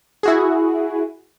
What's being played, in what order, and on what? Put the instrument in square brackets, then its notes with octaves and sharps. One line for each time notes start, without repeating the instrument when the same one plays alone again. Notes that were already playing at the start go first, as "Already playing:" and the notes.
[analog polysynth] E4 F#4 G#4